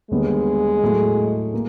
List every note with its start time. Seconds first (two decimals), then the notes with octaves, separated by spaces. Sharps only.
0.11 D#2 D3 G3 G#3 B3
0.83 A2 F#3 A3
1.54 A#3